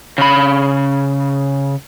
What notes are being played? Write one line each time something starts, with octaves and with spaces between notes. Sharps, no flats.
C#3 B5